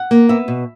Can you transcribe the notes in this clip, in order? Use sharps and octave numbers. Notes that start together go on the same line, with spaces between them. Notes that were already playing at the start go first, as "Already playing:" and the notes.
Already playing: F#5
A#3
B3 E5
B2